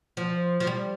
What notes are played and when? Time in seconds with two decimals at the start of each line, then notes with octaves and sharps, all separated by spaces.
0.17 F3
0.60 F3
0.67 G3